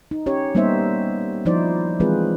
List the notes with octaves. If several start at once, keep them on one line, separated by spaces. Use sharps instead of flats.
D#4
C#4 G4 C#5
G3 A#3 B3 D#4 C5 E5
F3 D#4 E4 C5 D5
E3 G#3 C4 F4 G#4 B4